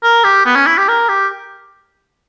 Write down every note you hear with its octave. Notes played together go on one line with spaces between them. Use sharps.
A#4
G4
B3
C#4
E4
G4
A#4
G4